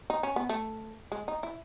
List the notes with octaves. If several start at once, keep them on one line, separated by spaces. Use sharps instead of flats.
D#4
C#4
B3
A3
G#3
D#4
E4